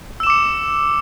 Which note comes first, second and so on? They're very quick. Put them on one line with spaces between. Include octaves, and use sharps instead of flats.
E6 E7 D6 C#7